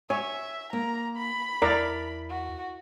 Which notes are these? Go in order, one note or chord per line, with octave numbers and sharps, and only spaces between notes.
C#5 E5 G#5
A#3 A#5
B5
E2 E4 A#4 D5 A#5
F#4